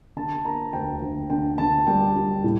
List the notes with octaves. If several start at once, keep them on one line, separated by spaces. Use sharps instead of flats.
D3 A5
A#3 A#5
D2 G5
D2
D3 G5
D3 A5
G3 G5
G3
A2